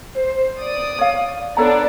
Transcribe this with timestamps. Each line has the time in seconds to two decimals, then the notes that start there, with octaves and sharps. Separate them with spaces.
0.15 C5
0.59 D5 D#6
0.99 C#5 F5
1.57 B3 D4 A4 C#5 D5 A#5